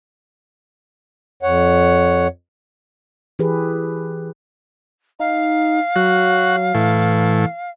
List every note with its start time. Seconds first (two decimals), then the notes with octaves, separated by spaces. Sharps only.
1.43 F2 C#5 F#5
3.39 E3 G4 G#4 B4
5.20 D#4 F5
5.96 F#3 F#4
6.74 A2 E3